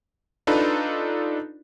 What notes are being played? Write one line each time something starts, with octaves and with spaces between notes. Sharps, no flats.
D4 D#4 F4 A4 B4